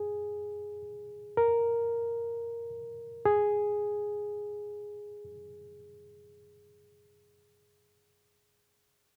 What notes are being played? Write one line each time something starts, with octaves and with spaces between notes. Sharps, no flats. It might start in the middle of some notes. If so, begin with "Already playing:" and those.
Already playing: G#4
A#4
G#4